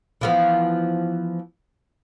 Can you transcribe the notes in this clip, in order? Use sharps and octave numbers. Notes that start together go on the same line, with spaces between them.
E3 F3 B3